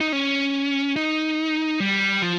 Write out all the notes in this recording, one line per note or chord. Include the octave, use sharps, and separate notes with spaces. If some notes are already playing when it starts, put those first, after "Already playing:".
D#4
C#4
D#4
G3
F3